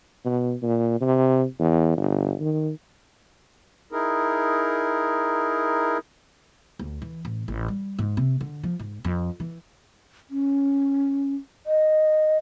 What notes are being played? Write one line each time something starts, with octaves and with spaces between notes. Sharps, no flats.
B2
A#2
C3
E2
G1
D#3
D#4 E4 G#4 A#4
D2
E3
A1
A1
G3
G#2
C3
D3
F3
G#2
F2
E3
C#4
D#5